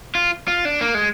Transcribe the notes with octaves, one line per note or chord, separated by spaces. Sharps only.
F4
F4
D4
A#3
G#3